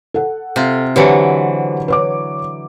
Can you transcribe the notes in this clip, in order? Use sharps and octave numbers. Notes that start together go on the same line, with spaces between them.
A4 F#5
C3 F4
D3 E3 F#3 G4 B4 C5
B4 C#5 D6